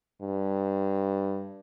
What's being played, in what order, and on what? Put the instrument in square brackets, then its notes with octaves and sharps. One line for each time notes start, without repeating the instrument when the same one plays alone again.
[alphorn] G2